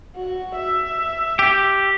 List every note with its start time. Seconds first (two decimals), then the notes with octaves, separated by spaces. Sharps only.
0.16 F#4
0.56 E5
1.39 G4